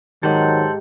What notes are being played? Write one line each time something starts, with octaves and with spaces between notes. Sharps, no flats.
G#2 D#3 F#3 G4 A4 C5 F#5